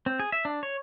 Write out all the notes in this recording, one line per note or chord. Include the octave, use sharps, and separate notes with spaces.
C4
G#4
E5
D4
C#5